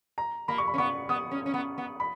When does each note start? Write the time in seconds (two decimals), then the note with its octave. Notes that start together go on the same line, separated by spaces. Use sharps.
0.18 A#5
0.48 A#3 B5
0.58 C#6
0.68 B5
0.74 C#4
0.78 B3 C#6
1.09 B3 D#6
1.31 C#4
1.46 C#4
1.54 B3
1.78 B3
2.00 B5